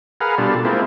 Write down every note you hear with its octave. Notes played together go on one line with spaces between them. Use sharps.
G#4 A#4 B4 F5 F#5
B2 G3 D4 F4 A4
G#3 A#3 C4 E4 F4